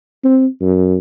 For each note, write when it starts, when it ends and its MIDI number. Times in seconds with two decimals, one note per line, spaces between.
0.24 0.47 60
0.61 0.98 42